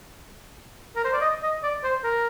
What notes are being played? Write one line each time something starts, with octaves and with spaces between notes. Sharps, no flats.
A#4
C5
D5
D#5
D#5
D5
C5
A#4